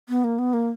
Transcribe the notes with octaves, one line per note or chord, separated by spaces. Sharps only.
B3
A#3
B3
A#3